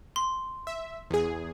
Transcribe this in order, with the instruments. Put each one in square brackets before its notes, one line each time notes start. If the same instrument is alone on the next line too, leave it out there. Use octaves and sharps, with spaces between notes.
[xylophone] C6
[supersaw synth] E5
E2 G#4